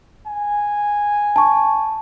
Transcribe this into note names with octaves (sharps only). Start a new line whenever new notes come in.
G#5
A5 C#6